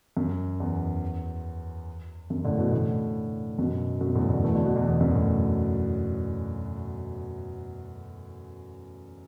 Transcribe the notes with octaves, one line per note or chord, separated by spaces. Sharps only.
F#2
E2
F#2
A2 D3
B2 E3
A2 D3
F#2 B2
F#2 B2
E2 A2
A2 D3
E3 A3
D3 F#3
B2 E3
E2
E2
F#2
A2